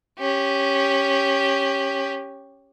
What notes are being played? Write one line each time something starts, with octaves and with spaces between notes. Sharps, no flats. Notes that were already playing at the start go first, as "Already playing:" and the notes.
C#4 G4